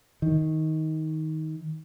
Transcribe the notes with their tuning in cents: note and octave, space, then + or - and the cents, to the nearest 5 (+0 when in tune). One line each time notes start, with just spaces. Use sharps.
D#3 +15